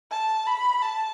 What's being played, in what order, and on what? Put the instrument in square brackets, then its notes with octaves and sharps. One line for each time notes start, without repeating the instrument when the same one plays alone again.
[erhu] A5
B5
A5